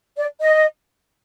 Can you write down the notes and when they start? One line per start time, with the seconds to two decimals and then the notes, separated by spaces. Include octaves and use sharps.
0.17 D5
0.41 D#5